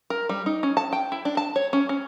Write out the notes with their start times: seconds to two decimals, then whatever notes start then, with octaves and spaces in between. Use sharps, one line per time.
0.10 A#4
0.29 G3
0.46 D#4
0.63 C#4
0.77 A5
0.93 G5
1.12 E4
1.25 D4
1.37 A5
1.56 C#5
1.73 C#4
1.89 C#4